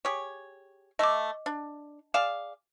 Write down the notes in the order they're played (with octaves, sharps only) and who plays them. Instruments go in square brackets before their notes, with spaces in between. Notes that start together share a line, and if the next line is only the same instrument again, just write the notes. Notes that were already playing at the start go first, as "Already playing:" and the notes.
[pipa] G4 G#4 C#5
[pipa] A3 E5 [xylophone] D#5 D6
[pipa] D4
[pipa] G#4 D5 F5 [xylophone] E7